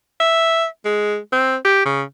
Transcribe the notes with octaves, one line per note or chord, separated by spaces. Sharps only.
E5
G#3
C4
G4
C#3